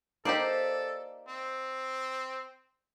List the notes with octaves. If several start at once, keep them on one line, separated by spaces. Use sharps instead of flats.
A#3 D#4 G4 A4 C5 D5
C4